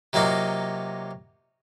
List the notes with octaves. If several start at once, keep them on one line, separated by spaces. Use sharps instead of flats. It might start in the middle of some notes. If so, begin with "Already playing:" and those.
C3 F#3 A#3 D#4 F4